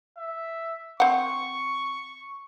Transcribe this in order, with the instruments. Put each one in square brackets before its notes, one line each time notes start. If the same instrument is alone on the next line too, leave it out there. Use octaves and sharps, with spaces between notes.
[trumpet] E5
[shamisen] C4 F#5 [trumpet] C#6